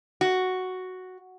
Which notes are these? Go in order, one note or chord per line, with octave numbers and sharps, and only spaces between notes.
F#4